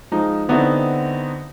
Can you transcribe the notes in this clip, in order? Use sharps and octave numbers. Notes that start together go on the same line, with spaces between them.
F3 G#3 D#4
D3 B3 C4 D#4 E4 F#4